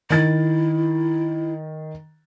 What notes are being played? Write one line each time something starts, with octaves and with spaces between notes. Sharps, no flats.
D#3 E4 A6